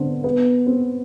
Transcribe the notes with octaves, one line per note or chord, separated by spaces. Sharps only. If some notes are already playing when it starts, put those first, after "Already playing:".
Already playing: D3 B3 C4
B3
C4